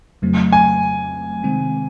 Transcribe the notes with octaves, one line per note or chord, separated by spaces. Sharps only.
F2 C#3 F#3 A3 C4
G#5
C3 D#3 G#3 C4